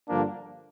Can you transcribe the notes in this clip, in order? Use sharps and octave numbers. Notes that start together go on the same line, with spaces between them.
G2 D3 F3 A#3 D4